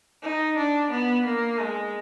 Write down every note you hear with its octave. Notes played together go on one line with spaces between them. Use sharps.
D#4
D4
B3
A#3
G#3